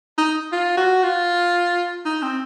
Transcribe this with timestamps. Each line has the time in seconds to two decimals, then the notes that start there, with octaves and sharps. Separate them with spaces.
0.18 D#4
0.52 F4
0.77 F#4
1.03 F4
2.06 D#4
2.23 C4